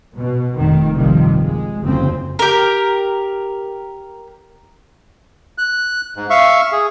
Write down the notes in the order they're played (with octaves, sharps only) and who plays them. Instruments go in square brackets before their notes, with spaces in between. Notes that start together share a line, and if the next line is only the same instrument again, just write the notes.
[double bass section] B2
F1 D#3
A#1 G2 C3 D#3 F3
G#3
F#1 D2 C#3 F3 C4
[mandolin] G4 A#4
[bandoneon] F#6
G#2
E5 F5 C#6
G#4